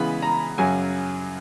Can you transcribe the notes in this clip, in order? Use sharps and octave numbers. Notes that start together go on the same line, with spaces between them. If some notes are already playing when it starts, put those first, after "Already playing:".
Already playing: C#3 E3 G#3 B3 B5
A#5
F#2 C#3 F#3 G#5